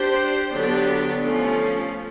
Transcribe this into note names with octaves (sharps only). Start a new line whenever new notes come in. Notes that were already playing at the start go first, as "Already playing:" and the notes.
Already playing: D4 G4 C5
D3 F#3 B3 D4 G4
F3 A3 C#4